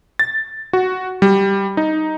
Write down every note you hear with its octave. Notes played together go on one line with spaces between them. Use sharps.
A6
F#4
G3
D#4